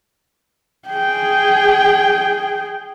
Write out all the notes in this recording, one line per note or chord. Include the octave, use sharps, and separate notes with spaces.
G#4 G5